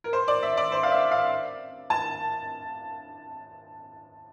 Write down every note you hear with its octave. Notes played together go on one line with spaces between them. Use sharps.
A#4
C5
D5
E5
D5
C5
F5
E5
F5
A5